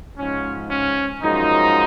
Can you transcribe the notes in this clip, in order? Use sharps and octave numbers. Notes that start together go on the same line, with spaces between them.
G#2 F3 G#3 C#4
C#4
F#2 F3 G#3 D#4